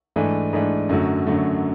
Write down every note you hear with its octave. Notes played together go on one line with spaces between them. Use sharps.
G#2 E3 A3 D4
G#2 E3 A3 D4
F#2 D3 F#3 A3
F#2 D3 F#3 A3